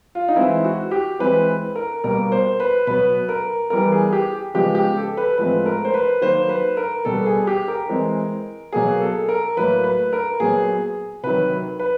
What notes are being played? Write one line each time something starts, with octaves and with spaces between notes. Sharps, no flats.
F4
D#4
E3 G#3 C4 E4
F#4
G4
E3 G#3 C4 B4
A#4
B2 G3 A#3 A#4
C5
B4
B2 F#3 B3 B4
A#4
E3 G3 B3 A#4
G#4
G4
C#3 F3 G#3 B3 G4
G4
A4
B4
A2 F3 G#3 C4 B4
A#4
C5
B4
D#3 F#3 A#3 C5
B4
A#4
B2 G3 B3 A4
G#4
G4
A#4
E3 G#3 C4
B2 F#3 A#3 G#4
A4
A#4
A2 F#3 A#3 B4
B4
A#4
A#2 F#3 B3 G#4
C3 D#3 F#3 B4
B4